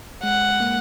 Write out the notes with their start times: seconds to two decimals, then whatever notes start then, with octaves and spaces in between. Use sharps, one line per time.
0.23 G#3 F#5
0.60 A#3